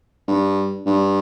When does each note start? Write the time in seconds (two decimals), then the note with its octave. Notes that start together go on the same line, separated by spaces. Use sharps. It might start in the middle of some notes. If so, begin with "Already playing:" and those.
0.28 G2
0.86 G2